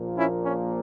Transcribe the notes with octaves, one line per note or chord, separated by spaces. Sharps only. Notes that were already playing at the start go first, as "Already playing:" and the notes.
Already playing: A#1 A#2 F3 A#3
C#4 E4
C#4